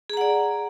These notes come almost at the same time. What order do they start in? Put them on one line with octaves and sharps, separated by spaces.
G#4 A#5 F#5 D5